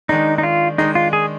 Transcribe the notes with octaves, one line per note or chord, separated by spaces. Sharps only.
D#3 G#3 D4 D#4
D#4
F4
D#3 G#3 D4 D#4
F4
G#4